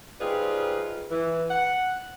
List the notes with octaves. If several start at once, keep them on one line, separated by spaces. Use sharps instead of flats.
G3 C4 D#4 F4 G#4 B4
E3
F#5